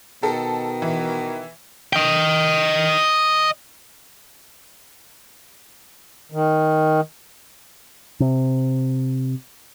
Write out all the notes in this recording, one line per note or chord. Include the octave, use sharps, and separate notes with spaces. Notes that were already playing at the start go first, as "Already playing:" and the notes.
B2 D#3 A4
E3
D#5 G5
D#3
C3